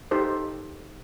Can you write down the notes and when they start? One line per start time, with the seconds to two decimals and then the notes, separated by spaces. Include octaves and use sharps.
0.11 D#4 G4 A4 C5